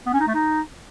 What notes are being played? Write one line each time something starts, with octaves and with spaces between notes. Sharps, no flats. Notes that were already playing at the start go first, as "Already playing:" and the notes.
B3
C#4
D#4
A3
D#4